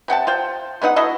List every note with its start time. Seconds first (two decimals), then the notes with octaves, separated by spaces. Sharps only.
0.08 C3 F#5 G5 A5
0.27 F4 C5 G5
0.82 G#3 B3 D#4 F#5
0.96 E4 F#4 A4 D#5